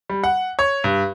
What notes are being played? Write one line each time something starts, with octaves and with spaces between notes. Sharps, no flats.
G3
F#5
C#5
G2